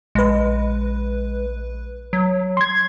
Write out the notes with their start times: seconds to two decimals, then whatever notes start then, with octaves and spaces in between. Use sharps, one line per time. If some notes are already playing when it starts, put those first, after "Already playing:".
0.15 A#1 G#3 B4
2.13 F#3
2.57 C6 G#6